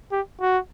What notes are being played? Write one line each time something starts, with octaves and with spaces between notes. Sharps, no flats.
G4
F#4